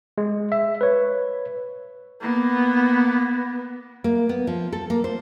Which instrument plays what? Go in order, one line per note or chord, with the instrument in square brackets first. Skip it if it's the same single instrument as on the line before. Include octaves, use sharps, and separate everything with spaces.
[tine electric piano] G#3
E5
B4 C#5
[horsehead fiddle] A#3 B3
[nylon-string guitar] A#3
B3
F3
A4
A#3
C5